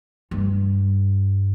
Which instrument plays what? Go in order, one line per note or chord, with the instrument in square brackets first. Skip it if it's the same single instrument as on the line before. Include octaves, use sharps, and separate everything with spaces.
[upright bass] G2